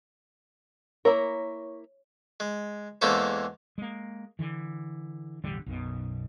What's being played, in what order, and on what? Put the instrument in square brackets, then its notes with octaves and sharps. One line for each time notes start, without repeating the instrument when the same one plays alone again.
[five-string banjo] A#3 E4 A#4 [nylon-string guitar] C#5
[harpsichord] G#3
E2 G#3 A#3 C#4 A4 C5
[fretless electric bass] G#3 A#3
D3 E3
E1 A1 D3 G3
B1 F#2 B2